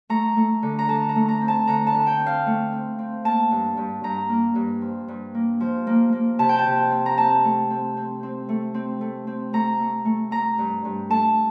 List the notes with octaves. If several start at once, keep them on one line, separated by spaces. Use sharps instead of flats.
A3 A#5
A3
D3
A#5
D3 A5
A#5
A3
A#5
C4
A5
D3 A#5
A5
D3
G5
C4
F5
A3
C4
C4
A#3 A5
G2
G2
G2 A#5
A#3
G2
F3
G2
A#3
F3
A#3
A#3
C3 A5
G5
A5
C3
C4
A#5
C4 A5
A3
C4
C4
C4
A3
C4
A3
C4
A3 A#5
A3
A3
A3 A#5
G2
G2
A3 A5